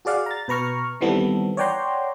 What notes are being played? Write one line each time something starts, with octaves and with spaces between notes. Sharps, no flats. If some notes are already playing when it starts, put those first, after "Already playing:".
F#4 G#4 D5 F5 F#5
A#5 A6
B2 B4 A#5 C#6 F6
D#3 E3 G3 B3 C4 A4
C#5 D5 F#5 G5 A#5 C6